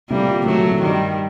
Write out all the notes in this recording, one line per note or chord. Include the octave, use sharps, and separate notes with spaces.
A2 C3 G3 A#3
A#2 D3
C3 D#3 F#3 A3
A#2 D3
A2 C3
G2 D#3 G3